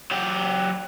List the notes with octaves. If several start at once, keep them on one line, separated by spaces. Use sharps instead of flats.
F#3 G4